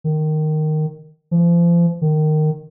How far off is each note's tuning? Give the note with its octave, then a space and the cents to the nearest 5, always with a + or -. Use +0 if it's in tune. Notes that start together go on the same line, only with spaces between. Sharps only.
D#3 -10
F3 -35
D#3 -15